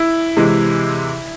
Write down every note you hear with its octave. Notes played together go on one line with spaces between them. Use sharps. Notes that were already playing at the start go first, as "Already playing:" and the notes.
Already playing: E4
C3 E3 G#3